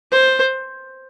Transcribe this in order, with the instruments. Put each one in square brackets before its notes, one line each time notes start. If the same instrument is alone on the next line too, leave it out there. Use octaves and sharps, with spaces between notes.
[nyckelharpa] C5